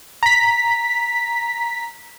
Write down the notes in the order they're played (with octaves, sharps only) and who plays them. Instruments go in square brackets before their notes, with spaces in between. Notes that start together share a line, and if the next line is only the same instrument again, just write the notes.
[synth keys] A#5 B6